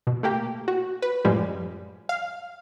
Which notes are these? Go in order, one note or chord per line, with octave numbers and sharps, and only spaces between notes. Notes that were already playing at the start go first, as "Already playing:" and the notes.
B2
A3 A#3 G4
F#4
B4
F#2 A2 F3 G3 G#3
F5